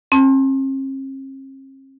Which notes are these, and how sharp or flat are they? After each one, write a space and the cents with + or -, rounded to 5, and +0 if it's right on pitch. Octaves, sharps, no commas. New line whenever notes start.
C4 +45 A5 +0